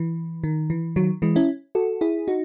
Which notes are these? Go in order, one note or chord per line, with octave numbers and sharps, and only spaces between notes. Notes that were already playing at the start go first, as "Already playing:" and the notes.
Already playing: E3
D#3
E3
D#3 F#3
E3 G#3
C#4 E4
F#4 A4
E4 G#4
D#4 F#4